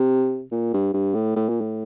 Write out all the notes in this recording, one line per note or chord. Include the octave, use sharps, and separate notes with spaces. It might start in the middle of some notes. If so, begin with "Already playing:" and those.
Already playing: C3
A#2
G2
G2
A2
A2
A#2
A2